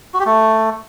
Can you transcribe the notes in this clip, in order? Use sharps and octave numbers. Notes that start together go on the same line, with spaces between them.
F#4
G4
A3